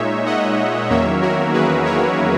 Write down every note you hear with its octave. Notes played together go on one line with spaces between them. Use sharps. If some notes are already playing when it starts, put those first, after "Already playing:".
Already playing: A#2 G#3 D#4 C#5 E5
D#5 F#5
E2 D#3 F#3 A#3 C#4 C#5 E5
F#4 A#4
G#4 B4
A#4 C#5